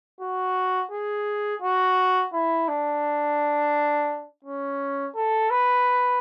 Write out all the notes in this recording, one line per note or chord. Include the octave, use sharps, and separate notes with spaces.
F#4
G#4
F#4
E4
D4
C#4
A4
B4